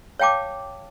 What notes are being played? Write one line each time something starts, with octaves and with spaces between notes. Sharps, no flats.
C#5 F5 G5 A5 D6